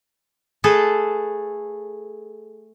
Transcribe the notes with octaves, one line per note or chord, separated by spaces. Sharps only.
A3 G#4 A4 B4